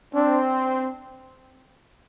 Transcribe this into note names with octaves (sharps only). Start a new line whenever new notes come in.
C4 D4